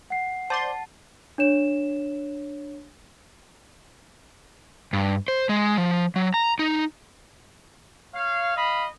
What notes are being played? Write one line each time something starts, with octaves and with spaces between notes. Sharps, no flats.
F#5 C7
C5 D5 A5 C6
D4 C#5 E7
G2
C5
G#3
F3
F#3
A#5
D#4
C#5 F5
D#5 F5 B5